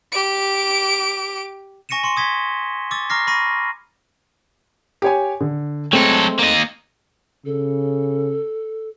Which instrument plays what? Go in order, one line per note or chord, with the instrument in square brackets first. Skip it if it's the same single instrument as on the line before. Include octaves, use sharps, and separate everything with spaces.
[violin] G4 D7
[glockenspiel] G#5 C#6 A#6 C#7 D#7 E7
C6 C#6 C#7
D#6 G#6 B6 G7
C#6 D6 E6 A6
A#5 C#6 D6 F6 A#6 C7
B5 C#6 A#6 D#7
[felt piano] G4 C#5 G#5
D3
[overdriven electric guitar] F#3 A4 [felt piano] G#3 A3 C4
[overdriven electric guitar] A#3 D#5
[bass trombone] C#3 [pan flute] A4